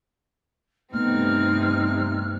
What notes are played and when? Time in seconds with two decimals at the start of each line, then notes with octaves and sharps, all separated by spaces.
0.93 G2 C3 A3 B3 C4 D#4 F6